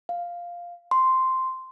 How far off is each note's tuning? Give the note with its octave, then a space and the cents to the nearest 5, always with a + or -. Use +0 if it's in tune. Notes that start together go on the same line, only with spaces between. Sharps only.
F5 +0
C6 -5